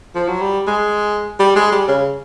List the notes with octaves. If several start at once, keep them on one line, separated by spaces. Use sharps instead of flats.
F3
F#3
G3
G#3
G3
G#3
G3
C#3